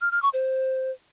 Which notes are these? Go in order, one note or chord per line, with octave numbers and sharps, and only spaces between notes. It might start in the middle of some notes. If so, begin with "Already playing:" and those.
F6
F6
C#6
C5